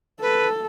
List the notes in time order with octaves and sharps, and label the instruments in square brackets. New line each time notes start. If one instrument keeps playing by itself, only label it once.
[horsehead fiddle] A4 [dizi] B4